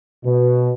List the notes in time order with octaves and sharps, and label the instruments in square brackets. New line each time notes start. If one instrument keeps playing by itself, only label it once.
[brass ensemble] B2